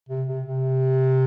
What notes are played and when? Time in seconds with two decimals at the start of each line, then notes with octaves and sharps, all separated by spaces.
0.09 C3
0.28 C3
0.46 C3